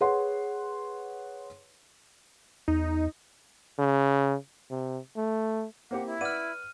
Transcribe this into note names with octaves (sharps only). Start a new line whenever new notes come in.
G#4 B4 C#5 F#5 C6
E2 D#4
C#3
C3
A3
A#3 C4 G4 F#5
E4
B4 D5 F#5 F6 D#7